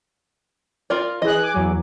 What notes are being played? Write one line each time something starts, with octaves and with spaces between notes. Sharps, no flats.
F4 A#4 D5
E3 G#4 D#5 F#6
G#5 D6
E2 F#3